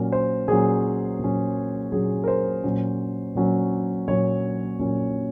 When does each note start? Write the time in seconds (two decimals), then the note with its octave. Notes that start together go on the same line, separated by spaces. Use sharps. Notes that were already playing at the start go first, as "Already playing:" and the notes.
Already playing: A#2 F#3 C#4 A#4
0.12 C5
0.48 A#2 F#3 C#4 G#4
1.19 A#2 F#3 C#4
1.92 A#2 F#3 C#4 G#4
2.24 A#4
2.28 C5
2.64 A#2 F#3 C#4
3.35 A#2 F#3 C#4
4.08 A#2 F#3 C#4 C#5
4.79 A#2 F#3 C#4